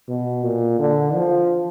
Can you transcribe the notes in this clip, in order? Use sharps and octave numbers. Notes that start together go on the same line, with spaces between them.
B2
A#2
D3
F3